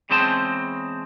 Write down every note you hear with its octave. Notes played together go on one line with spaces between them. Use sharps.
E2 C#3 G#3 C4 C5 A5